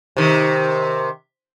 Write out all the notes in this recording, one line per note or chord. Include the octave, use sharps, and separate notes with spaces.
C3 D#3